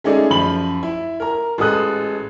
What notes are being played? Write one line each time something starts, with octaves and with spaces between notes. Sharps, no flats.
G#3 A3 C#4 D#4 G#4 D5
F#2 F3 B5 F#7
E4
A#4 A#5
A1 G#3 A4 D#6 F#6